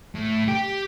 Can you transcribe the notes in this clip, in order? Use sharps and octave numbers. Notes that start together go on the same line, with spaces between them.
A2
G4